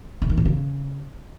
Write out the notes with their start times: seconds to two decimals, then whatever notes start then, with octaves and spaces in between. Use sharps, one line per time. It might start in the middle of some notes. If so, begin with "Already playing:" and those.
0.22 C3
0.30 D#3
0.37 A2
0.45 C#3